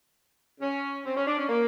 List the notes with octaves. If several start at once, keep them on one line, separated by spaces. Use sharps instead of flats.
C#4
C4
C#4
D4
C#4
A#3